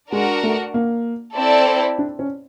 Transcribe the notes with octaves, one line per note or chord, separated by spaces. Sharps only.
G#3 D4 F#4 A#4 D5 F#5
A3
A#3
C4 E4 A4 D5
D4
C#4